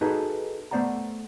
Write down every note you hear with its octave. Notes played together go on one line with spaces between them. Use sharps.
D#4 F#4 G#4 A4 B4 D#5
A3 B3 C5 D5 F#5 A#5